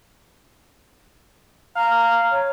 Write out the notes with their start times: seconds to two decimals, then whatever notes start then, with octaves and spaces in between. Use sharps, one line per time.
1.76 F5 A#5
2.31 C#5